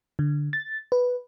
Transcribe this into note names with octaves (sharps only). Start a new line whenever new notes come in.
D3
A6
B4